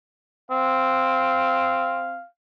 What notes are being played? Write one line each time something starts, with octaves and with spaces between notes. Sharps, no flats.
C4 F5